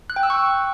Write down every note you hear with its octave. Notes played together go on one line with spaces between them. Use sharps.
F#6
G5
E6
C#6